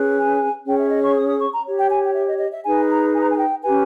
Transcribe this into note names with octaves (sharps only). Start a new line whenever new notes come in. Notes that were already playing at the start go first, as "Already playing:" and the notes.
Already playing: C#4 G#4 B4
G#5
C#4 G#4 C#5 G5
E5
D#5
C#6
D#6
D#6
C#6
A#5
G4 C#5
G5
G#5
G5
E5
D#5
D#5
E5
D#4 G#4 B4 G#5
A#5
G#5
A#5
G#5
G5
C#4 G4 B4 G#5